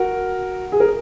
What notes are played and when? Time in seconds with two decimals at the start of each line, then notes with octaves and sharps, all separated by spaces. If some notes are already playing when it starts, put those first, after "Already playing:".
Already playing: F#4 A#4
0.72 G#4
0.80 A#4